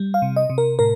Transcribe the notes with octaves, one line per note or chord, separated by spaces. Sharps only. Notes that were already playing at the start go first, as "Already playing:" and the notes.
Already playing: G3
F5
C3
D#5
C3
A#4
A2 A#4